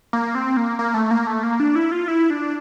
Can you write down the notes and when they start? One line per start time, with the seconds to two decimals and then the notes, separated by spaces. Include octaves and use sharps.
0.13 A#3
0.35 C4
0.57 A#3
0.79 A#3
0.94 A3
1.11 A#3
1.27 A3
1.43 A#3
1.60 D4
1.75 E4
1.91 F4
2.08 E4
2.30 D4